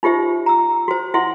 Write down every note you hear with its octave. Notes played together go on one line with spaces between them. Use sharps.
D#4 F4 G4 C5 E5
A#5 E6
F#4 C5
E4 E5 F#5 C6